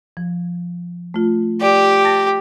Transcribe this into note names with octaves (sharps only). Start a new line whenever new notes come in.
F3
A3 F4
G4 D5
A5 A6 A#6